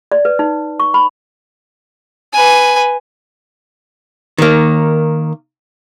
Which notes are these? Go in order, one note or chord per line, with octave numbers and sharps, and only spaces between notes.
D5
B4
D#4
C#6
B5
B4 G#5
D#3 A#3